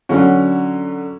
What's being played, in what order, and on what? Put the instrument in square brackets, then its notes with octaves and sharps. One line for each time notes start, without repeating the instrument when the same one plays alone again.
[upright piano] D3 F#3 C#4 F#4